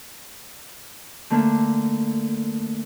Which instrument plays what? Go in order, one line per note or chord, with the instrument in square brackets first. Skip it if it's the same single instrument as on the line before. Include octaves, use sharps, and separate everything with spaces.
[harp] D3 A3 A#3 D4